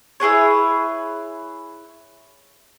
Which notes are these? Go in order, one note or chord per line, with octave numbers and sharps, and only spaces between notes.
E4 G#4 B4 C#5